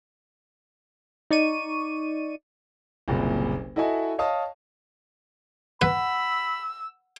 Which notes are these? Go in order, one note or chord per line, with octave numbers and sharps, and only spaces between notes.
D#4 D5 C#6 D#7
F#1 C2 A#2
E4 F#4 A4 D#5 E5 G#5
C#5 D#5 F5 A5 D#6
B4 F#5 B5 E6